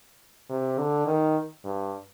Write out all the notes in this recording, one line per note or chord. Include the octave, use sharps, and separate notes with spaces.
C3
D3
D#3
G2